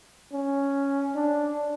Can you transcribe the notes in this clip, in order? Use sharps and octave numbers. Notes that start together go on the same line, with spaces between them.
C#4
D4